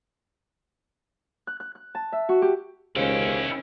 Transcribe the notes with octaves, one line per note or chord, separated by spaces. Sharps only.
F#6
F#6
F#6
A5
E5
F#4
G4
C#2 D#3 C#4 E4 G4 C5 F5 G5